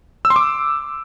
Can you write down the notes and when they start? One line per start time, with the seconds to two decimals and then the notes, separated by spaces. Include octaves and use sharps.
0.25 E6
0.30 C6
0.36 D6